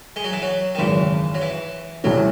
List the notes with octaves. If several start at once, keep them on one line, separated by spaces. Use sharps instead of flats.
G#3
F#3
E3
F#3
D#3
G#1 F#2 C#3 E3
F#3
E3
C2 C3 E3 F#3 A3 C#4